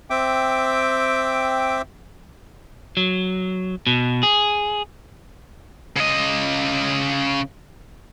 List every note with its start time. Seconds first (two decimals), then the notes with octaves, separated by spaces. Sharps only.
0.10 C4 E5 G5 D6
2.97 F#3
3.87 B2
4.23 G#4
5.97 C#3 D#5